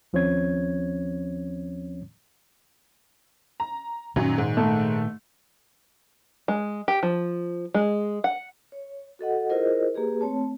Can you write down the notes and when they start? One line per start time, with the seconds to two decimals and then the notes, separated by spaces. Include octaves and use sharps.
0.13 D#2 F3 C4 C#4 C#5 G#6
3.60 A#5
4.16 F#2 A#2 D#3 F#3
4.38 G#2
4.57 A3
6.48 G#3
6.88 G4
7.03 F3
7.74 G#3
8.24 F#5
8.72 C#5
9.19 F#4 A4 D#5 F#5
9.50 E4 F4 G#4 A#4 C5 D#5
9.94 A#3 G4 G#4 B4
10.21 A3 C4 C#5 A5